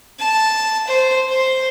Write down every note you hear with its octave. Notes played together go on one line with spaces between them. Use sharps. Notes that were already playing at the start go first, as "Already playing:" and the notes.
A5
C5
C5